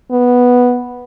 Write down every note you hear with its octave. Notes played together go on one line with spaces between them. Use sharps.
B3